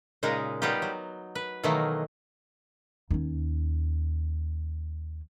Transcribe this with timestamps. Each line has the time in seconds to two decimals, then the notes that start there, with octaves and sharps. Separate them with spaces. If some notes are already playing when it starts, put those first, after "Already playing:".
0.23 A#2 C#3 G#3 D#4 A#4
0.62 G3 B3 D#4 F4 G4
0.82 F#3
1.35 B4
1.63 B2 D#3 E3 F#3 A3 A#3
3.11 D#2 C#4